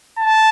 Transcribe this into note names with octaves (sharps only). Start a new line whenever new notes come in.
A5